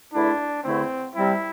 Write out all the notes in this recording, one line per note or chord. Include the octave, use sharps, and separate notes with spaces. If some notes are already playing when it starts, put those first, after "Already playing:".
E2 D3 A3 D4 E4
E2 D3 A3 C4 E4
C3 G3 C4 E4